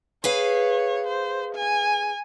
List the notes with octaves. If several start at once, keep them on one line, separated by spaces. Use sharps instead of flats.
G#4 B4 C#5 F5
C5
G#5